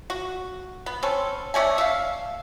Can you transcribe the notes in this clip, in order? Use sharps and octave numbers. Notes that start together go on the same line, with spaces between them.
F#4
B3
C4 C#4 A4
A3 C#4 D5 G#5
E5 F5